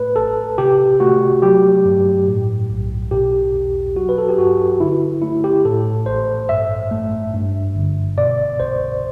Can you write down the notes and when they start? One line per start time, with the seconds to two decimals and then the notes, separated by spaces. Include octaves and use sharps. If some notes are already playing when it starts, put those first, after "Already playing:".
Already playing: A2 A3 B4
0.16 A1 A4
0.58 C3 G4
1.00 A3 F#4
1.42 F#3 G4
1.85 G2
2.27 A2
2.70 B1
3.11 B2 G4
3.53 E2
3.95 F#3 F#4
4.09 B4
4.18 A4
4.29 G4
4.38 G2 F#4
4.80 D3 E4
5.22 A3 E4
5.44 G4
5.65 A2 A4
6.06 A1 C5
6.49 G2 E5
6.91 A3
7.33 G2
7.75 G1
8.18 B2 D5
8.60 C2 C5